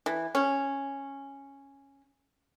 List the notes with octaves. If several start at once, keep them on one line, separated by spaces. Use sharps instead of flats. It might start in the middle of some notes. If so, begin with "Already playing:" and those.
E3
C#4